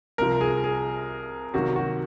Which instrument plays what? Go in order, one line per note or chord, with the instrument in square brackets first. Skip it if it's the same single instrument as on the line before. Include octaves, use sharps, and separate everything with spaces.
[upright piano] C2 C3 F3 [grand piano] A#4
[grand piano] G#4
G#4
[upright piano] C3 D#3 F#3 A#3 [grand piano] F#4
[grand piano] F#4